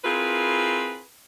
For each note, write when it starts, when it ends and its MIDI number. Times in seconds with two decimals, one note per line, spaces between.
0.04 1.01 60
0.04 1.01 64
0.04 1.01 65
0.04 1.01 68
0.04 1.01 70
0.04 1.01 71